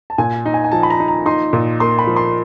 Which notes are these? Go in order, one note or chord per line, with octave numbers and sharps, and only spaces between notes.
A5
A#2 G#5
D#4
G#5
G#5
F3 A5
B5
A#5
D#4
A#5
D#4 C6
A#2
A#3 C6
B5
F3
C6